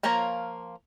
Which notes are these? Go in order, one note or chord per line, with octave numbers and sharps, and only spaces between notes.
F3 A#3 F4 C#5 A#5